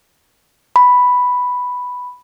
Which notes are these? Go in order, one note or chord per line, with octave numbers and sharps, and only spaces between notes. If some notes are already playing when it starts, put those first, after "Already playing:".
B5